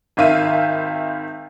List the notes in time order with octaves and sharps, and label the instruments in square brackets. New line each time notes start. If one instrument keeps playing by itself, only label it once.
[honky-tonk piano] G#1 D#3 E5 F5 D#7